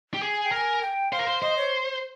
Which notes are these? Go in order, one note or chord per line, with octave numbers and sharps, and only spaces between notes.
G4
G#4
G#5
G5
A#4 G#5
G5
C5 F5
A#4
C5
C5 D#5
C#5